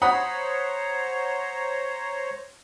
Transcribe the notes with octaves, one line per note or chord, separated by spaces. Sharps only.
C5 C#5 F#5 A#5 B5 D#6